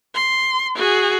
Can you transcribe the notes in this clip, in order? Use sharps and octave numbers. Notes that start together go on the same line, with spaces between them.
C6
F#4 G#4